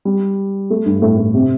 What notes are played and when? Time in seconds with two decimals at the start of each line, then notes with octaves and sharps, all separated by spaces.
0.05 G3
0.70 A3
0.86 G2
1.02 A2
1.17 A2
1.34 C3